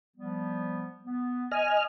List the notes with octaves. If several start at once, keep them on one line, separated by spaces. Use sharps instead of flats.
F3 G3 B3
B3
D#5 G#5 F6